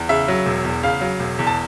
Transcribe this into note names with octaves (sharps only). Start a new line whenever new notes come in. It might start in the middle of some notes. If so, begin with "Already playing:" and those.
Already playing: E2
C#3 E5
F#3
E1
E2
C#3 F5
F#3
E1
E2
A5